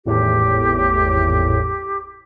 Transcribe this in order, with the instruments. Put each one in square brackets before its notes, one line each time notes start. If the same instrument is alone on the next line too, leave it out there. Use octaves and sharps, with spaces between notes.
[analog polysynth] G#1 E2 A2 [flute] G4